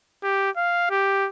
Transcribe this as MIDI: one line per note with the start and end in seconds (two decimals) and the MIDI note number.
0.23 0.50 67
0.57 0.89 77
0.90 1.29 67